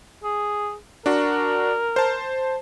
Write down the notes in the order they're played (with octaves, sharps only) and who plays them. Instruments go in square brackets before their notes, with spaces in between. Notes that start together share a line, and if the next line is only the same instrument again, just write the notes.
[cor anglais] G#4
[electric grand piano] D4 F#4 [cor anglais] A#4
[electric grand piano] C5 A5